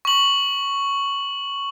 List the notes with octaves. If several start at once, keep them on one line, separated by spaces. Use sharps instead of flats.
C#6 F#7